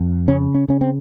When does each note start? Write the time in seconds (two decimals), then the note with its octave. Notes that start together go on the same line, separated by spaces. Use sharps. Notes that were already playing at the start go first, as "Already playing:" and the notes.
Already playing: F2
0.28 C#3 C#4
0.55 C#4
0.68 C#3 C#4
0.81 C4